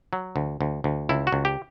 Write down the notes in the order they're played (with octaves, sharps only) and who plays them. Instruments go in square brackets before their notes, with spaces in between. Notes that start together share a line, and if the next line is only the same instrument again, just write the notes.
[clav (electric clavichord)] F#3
D2
D2
D2
C#2 E4
F#4
C#2
G4